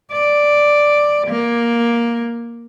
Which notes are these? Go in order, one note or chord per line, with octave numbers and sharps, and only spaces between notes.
D5
A#3